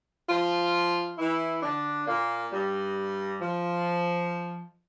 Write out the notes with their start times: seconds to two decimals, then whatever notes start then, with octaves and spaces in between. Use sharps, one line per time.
0.29 F3 F4
1.18 E3 E4
1.62 D3 D4
2.07 A#2 A#3
2.52 G2 G3
3.40 F3